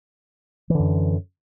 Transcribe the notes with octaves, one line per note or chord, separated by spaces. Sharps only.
F#2 D3 E3